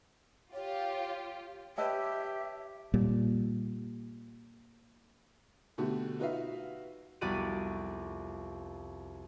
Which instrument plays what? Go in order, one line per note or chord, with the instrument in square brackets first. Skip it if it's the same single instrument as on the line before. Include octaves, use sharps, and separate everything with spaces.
[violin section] F4 G4 [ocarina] C#5
[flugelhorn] G4 [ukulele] B4 D#5 G5 [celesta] C#5 A5 E6 [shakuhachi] E5
[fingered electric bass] A#2 G3
[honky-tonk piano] B2 D3 A3 F#4 G4
D#4 F4 F#4 B4 E5 F5
[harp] C2 F2 B3 F#4 D5 D#7